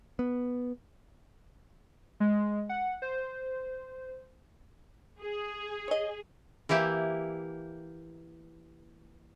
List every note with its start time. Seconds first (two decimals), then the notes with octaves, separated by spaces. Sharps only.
0.19 B3
2.20 G#3
2.69 F#5
3.02 C5
5.20 G#4
5.88 C#5 D#5
6.69 E3 A#3 E4 G4